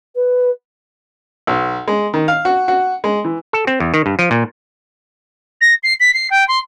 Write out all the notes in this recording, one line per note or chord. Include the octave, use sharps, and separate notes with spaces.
B4
B1
G#3
D#3
F5
F#4
F#4
G#3
E3
A4
C4
E2
D#3
G2
F3
A#2
A#6
C7
B6
C7
G5
C6